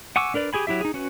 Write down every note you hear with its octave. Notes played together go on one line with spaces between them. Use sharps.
F#5 G#5 C#6 D6 E6
D4 A#4 B4 D5
G4 G#4 G#5 B5
F#3 E4 G4 E5
D#4 G#4
C#4 F#4 B4